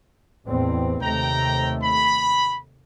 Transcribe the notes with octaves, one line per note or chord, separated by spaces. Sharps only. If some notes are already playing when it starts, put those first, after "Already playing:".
A1 E2 C4
D#2 C3 A3 G5 A#5
B5